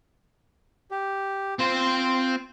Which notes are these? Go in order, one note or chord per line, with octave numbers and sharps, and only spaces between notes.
G4
C4 F4 C5